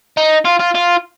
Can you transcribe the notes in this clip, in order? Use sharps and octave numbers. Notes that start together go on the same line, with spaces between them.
D#4
F4
F4
F4